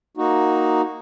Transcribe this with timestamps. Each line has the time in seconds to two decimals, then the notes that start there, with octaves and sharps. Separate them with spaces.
0.17 A#3 D#4 F#4